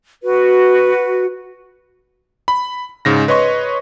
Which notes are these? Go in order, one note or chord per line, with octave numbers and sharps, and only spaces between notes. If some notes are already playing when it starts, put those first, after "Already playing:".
F#4 B4
B5
G#2 C#3 A#6
B4 C#5 D#5 C6 C#6